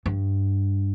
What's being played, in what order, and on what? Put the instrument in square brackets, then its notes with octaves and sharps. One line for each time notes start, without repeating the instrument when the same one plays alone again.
[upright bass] G2